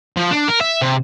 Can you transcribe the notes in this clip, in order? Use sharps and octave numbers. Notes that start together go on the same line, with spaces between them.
F3
D4
A#4
E5
C3